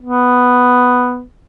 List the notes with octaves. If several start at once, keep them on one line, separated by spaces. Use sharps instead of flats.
B3